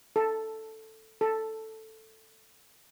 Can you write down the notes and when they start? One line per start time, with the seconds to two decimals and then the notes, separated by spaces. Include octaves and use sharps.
0.16 A4
1.21 A4